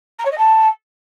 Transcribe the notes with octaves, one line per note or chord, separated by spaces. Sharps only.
A#5
C#5
D#5
A5